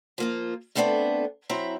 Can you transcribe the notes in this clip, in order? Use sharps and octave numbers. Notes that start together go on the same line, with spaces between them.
F3 A#3 F4
A3 B3 C4 D4 G4 A4
F#3 C4 E4 E5 A#5